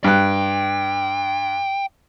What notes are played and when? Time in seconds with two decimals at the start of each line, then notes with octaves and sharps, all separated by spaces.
0.04 G2 G5 F#6